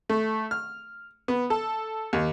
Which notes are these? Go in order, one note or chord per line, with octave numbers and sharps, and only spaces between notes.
A3
F6
B3
A4
D#2